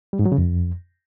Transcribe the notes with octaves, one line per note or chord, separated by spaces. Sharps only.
G3
G#2
F#3
C#3
F2